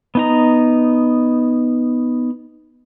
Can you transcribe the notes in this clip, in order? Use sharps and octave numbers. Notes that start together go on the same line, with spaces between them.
B3 D#4 A#5